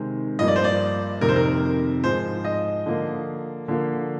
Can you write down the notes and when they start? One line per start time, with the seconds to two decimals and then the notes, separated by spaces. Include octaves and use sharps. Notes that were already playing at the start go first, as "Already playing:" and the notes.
Already playing: C3 D#3 G#3 C4
0.39 G2 F3 A#3 D#5
0.48 D5
0.56 C5
0.64 D5
1.21 F2 C3 D#3 A#4
1.29 C5
1.36 A#4
2.04 G#2 F3 G#3 C5
2.45 D#5
2.86 D3 F3 A#3
3.68 D3 F3 A#3